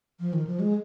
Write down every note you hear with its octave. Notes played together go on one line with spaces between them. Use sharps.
F3
D#3
F3
G#3